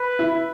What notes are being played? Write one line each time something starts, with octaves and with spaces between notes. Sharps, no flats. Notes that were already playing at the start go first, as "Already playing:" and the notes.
Already playing: B4
E4